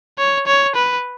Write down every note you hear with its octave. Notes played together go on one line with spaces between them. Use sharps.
C#5
C#5
B4